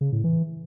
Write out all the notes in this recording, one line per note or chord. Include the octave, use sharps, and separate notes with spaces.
C#3
A2
E3